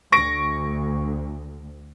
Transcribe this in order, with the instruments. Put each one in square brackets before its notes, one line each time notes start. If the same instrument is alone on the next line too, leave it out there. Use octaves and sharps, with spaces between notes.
[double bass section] D2 [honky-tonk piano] C#6 A#6 D7